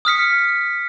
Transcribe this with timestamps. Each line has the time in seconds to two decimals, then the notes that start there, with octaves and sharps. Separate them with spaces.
0.05 D#6 F6 B6 C#7